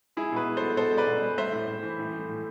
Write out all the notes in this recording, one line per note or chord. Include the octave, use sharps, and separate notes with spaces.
G#3 E4 G#4
B2 G#4 B4
G#3
A4 C5
B2
B2 A4 C5
G#3
B4 D5
B2
G#3
A3 C5 E5
A2
A2
E3
A2
A3
A2